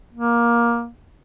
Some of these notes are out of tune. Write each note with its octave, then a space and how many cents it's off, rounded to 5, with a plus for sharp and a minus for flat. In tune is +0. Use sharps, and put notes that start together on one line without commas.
A#3 +15